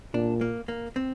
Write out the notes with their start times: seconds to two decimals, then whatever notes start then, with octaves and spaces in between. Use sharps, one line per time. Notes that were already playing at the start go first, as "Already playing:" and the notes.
0.14 A#2 D4
0.41 A#3
0.68 A#3
0.96 C4